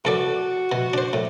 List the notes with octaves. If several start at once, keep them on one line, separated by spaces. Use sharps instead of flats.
E2 F#4 A4 D5
B2
D4 C5
A2